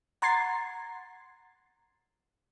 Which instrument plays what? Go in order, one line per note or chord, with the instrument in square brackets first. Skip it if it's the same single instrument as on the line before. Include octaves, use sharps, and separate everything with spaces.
[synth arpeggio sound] F#5 A#5 C6 G#6 A6 C7